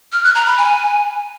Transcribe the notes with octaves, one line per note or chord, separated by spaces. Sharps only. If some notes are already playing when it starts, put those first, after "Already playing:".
F6
F#6
A#5
B5
G#5